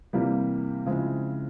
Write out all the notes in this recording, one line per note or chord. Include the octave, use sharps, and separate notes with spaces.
C3 E3 G3 A#3
C#3 F3 G#3 C4 E4